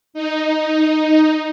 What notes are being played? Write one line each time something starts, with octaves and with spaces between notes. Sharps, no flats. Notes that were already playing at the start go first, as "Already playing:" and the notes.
D#4